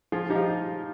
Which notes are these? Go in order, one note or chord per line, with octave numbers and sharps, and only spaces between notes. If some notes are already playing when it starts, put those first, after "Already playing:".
F3 F4 G#4
D#4 G4
F3